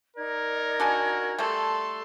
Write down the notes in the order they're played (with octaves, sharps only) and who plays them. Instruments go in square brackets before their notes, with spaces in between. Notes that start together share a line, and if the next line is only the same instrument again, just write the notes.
[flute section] D#4 D5 G#6 [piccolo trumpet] A#4
[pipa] D4 A4 G#5 [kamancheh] F#4
[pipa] G3 A3 [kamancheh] A4 C6